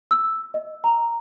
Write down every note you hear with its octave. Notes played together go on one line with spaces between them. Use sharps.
E6
D#5
A#5